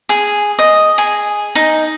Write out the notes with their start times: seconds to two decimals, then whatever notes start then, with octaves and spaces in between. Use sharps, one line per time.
0.09 G#4
0.59 D#5
0.98 G#4
1.55 D#4